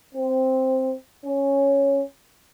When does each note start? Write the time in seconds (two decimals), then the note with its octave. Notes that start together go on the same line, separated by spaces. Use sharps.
0.14 C4
1.23 C#4